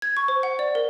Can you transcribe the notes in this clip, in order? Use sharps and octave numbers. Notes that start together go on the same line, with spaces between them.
G#6
C#6
C5
F#5
D5
A#4